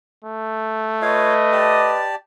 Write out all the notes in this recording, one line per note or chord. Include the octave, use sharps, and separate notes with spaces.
A3
F4 B4 C#5 D#5 F5
G4 D5 A5